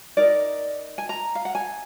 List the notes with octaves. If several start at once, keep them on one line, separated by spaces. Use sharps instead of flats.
D#4 A#4 D5
G#5
A#5
F5
F#5
G#5